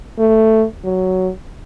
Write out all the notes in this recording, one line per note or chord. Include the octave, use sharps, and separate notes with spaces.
A3
F#3